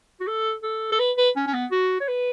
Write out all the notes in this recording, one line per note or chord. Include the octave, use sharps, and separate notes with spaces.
F#4
A4
A4
A4
B4
B4
C#4
C#4
B3
F#4
C#5
B4